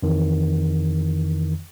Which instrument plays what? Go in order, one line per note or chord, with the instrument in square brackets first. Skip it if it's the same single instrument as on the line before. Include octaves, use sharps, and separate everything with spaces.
[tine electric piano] F2 D#3 E3